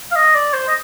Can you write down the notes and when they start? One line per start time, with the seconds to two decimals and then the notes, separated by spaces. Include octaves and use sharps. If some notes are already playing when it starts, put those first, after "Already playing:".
0.11 F5
0.16 D#5
0.35 D5
0.53 C5
0.68 D#5